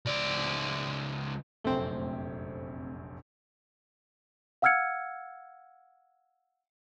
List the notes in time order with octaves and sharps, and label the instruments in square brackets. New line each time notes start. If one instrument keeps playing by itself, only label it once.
[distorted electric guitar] C#2 D5
[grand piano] F1 A#1 F#2 [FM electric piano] A3 C4
[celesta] F5 F#5 E6 F6 G#6 C#7